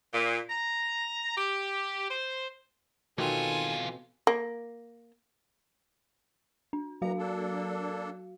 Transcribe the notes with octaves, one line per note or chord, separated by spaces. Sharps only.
A#2
A#5
G4
C5
B2 D#3 E3 C4 F4 A4 G#5
A#3
D4
E3 F#3 F#4 F5 A#5
A#3 D4 A4